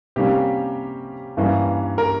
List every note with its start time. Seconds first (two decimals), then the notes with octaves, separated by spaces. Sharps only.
0.16 C3 G3 A#3 C#4 G4
1.37 G2 E3 G3 A#3 C#4
1.98 A#4